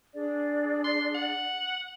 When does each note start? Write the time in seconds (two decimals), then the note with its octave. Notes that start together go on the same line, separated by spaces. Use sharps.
0.14 D4 G#4 D5
0.84 C6
1.14 F#5